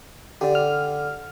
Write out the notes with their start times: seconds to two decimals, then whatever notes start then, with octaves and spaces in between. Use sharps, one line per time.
0.41 D3 G4 D5
0.55 F6